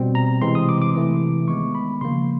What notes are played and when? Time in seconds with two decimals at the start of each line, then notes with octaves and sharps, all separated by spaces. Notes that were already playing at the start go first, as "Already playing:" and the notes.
Already playing: B2 G3 C4
0.15 A#5
0.42 C3 E3 G#3 C4 C6
0.55 D#6
0.69 D6
0.82 D6
0.95 C3 E3 A3
1.48 D#3 G#3 B3 C#6
1.75 B5
2.01 C#3 F3 A#3 C6